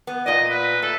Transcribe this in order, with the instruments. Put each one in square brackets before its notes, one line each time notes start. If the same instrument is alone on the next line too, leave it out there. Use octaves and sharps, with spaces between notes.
[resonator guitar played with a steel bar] B3
[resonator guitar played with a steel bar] A#2 D5 [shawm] D#5
[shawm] B4
[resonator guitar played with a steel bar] A3 [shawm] A4